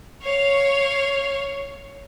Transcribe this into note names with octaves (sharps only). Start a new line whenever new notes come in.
C#5 F5